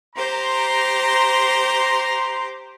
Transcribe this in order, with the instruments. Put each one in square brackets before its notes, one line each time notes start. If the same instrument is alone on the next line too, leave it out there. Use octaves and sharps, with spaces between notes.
[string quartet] G4 C5 [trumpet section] A#5 C6